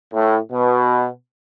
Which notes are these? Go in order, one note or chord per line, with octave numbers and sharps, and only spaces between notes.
A2
B2